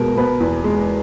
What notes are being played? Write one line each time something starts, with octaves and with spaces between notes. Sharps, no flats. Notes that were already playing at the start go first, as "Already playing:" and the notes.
Already playing: B2 G#3 A#4
B2 B4
E2
G#3